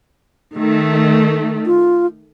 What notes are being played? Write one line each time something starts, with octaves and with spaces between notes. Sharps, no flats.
D#3 A3
F4